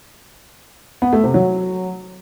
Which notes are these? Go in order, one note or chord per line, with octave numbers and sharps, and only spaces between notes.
B3
A3
C3
F#3